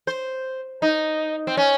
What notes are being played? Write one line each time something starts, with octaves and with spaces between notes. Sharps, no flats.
C5
D#4
C4
C#4